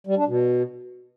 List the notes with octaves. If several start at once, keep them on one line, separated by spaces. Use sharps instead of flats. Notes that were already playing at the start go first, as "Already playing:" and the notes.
G3
D4
B2